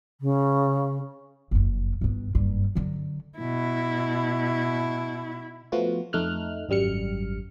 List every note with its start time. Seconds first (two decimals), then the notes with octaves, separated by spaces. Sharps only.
0.21 C#3
1.51 F#1 F2
2.01 G1 G2
2.35 F#1 G2
2.75 D3 F#3
3.38 B2 E4
5.72 F3 A3 B3 F4 F#4
6.13 F2 A3 D#4 F6 F#6
6.69 G#1 F#2 G3 F6 C#7